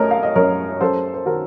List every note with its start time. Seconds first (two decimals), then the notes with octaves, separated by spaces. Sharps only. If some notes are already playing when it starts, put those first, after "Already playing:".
Already playing: F#2 A3 A#4 C#5 D#5
0.11 F5
0.23 D#5
0.35 F#2 A#4 C#5
0.81 F#2 A4 C5
1.14 C5
1.26 D#3 F#4 A#4